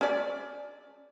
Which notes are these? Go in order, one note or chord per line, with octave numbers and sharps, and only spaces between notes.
C#4 D5